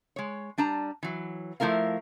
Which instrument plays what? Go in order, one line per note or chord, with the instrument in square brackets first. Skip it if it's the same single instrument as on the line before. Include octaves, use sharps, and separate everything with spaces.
[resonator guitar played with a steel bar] G#3 C#5
G3 D4 A5 A#5
E3 F#3
F3 A3 E4 A#4 F5